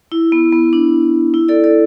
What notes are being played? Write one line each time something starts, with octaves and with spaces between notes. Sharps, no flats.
E4
B3
B3
D4
E4
A4 D5
A4 D5